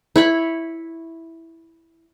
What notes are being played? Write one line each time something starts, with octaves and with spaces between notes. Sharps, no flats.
E4 C#5 B5